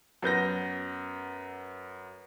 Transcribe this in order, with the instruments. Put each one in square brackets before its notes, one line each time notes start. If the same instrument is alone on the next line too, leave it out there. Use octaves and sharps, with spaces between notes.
[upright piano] F#2 B3 G6 A#6